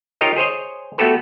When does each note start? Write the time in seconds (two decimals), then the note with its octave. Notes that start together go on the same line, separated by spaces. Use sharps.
0.21 D#4 F4 G4 A#4 C#5 D#5
0.36 G#4 C5 C#5 D#5
0.98 A3 B3 F#4 G4 A4 B4